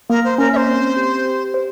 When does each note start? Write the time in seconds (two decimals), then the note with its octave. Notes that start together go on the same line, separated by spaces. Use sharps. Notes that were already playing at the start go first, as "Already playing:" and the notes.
0.10 A#3 A#4
0.24 C5
0.38 C#4 A#4
0.53 E5
0.56 C5
0.68 C4
0.96 G4
1.25 G4
1.54 C5